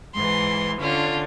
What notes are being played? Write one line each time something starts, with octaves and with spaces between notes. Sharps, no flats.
G#2 E3 C6
D3 C#4 D4 F4